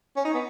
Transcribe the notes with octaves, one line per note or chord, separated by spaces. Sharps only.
C#4
D#4
B3